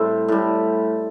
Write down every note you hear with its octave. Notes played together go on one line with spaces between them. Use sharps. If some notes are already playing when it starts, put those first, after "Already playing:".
Already playing: A2 G3 C4
A2 G3